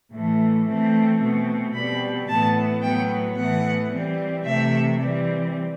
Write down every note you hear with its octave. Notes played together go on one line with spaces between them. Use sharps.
A2 E3 A3
E3 A3 C4
B2 A3 C4
B2 G3 C4 B5
A2 E3 B3 A5
A2 F#3 B3 G5
A2 E3 B3 F#5
E3 G3 C4
C3 E3 A3 C4 E5
E3 G3 C4